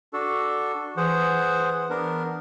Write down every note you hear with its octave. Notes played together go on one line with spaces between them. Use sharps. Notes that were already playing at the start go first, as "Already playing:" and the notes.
D4 F#4 A4
E3 G#4 C5 F#5
B3 D4 A#4